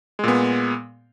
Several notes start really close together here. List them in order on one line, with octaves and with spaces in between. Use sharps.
G#3 A#2 B3